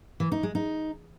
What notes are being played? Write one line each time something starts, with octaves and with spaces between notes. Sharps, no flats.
E3
D#4
G#3
D#4